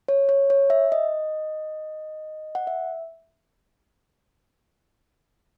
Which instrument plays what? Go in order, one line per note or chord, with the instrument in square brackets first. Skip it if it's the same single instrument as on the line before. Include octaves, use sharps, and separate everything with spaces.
[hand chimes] C#5
C#5
C#5
E5
D#5
F#5
E5